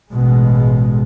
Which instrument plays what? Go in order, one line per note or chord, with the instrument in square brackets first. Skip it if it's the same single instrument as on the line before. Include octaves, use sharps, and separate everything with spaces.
[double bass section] A1 B2 G#3